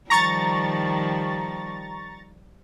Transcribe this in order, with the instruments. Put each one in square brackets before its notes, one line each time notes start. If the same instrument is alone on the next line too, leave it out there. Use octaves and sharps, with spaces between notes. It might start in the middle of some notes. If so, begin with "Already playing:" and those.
[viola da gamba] D#3 F3 G3 [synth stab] A#5 C#6 A6